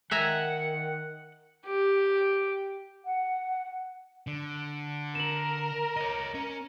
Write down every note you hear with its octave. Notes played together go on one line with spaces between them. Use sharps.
D#3 E5 F#5 G#5 A#5
G4
F#5
D3
A#4 E7 F#7
C#5 D#5
C#4